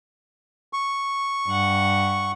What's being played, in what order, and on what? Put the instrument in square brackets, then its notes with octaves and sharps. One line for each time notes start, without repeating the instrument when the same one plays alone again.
[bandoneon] C#6
[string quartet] G2 F#5